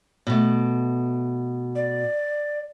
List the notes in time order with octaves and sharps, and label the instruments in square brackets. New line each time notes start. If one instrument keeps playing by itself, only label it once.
[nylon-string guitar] B2 A3
[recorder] D5